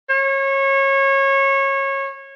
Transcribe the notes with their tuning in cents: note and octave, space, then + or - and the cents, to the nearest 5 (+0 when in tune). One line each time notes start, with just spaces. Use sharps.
C#5 -25